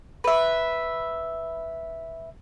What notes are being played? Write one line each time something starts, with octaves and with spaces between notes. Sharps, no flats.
B4 E5